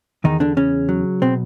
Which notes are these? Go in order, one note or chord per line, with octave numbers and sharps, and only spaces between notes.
E2 D#3 D#4
D3 D4
C#3 C#4
F#3
B2 C4